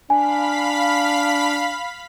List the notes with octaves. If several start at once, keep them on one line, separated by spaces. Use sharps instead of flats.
D4 F5 G#5 B5 B6